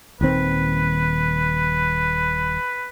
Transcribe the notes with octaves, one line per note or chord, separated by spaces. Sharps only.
D#1 D#3 C4 B4